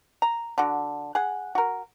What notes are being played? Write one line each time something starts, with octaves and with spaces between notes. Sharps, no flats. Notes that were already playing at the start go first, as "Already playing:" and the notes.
A#5
D3 F#4
G#4 F#5
F#4 A#4